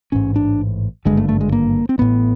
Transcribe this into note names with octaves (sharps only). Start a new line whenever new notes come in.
A1 G#2 C#4
D4
G#1 G2 D3 G#3
A3
A3
G#3
A#3
C4
A1 A2 B3